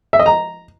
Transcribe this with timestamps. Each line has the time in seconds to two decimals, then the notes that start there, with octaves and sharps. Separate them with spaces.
0.13 E5
0.19 D#5
0.26 A#5